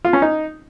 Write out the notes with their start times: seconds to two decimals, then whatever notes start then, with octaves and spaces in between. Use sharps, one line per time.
0.05 F4
0.13 C#4
0.22 D#4